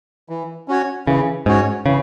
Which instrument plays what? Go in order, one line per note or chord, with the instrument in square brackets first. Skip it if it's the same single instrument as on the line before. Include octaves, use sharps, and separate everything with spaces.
[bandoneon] E3
C#4 F#4 C#5
[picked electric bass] C#3 [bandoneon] E3
[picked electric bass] G#2 [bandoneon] C#4 F#4 C#5
[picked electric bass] C#3 [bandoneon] E3